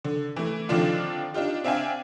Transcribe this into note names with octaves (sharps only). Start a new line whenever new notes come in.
D3
E3 A3
D3 D#3 F3 C4 D4 F4
D4 D#4 F4 G4
C4 D4 E5 F5 G5 G#5